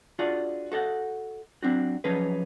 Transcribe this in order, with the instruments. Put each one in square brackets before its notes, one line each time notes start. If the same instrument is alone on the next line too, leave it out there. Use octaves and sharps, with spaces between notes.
[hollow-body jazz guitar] D4 F4 F#4 G#4 D5 F5
F#4 A4 D#5 F#5
F#3 C4 D4 F#4
F3 F#3 C#4 D#4 G#4 B4